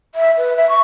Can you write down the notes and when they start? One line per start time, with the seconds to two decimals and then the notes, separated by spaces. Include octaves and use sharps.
0.15 E5
0.38 B4
0.57 E5
0.69 C#6